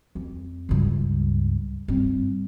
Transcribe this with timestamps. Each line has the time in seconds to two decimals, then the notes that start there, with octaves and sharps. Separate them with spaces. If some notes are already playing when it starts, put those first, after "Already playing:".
0.15 F2
0.69 C#2 G2
1.88 G2 C4